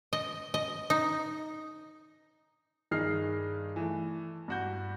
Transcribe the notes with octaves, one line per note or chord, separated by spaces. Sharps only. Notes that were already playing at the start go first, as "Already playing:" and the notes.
D#5
D#5
D#4
G2 D#3 D#4 G#4 F6 C7
E3 A3
G2 F#4 G6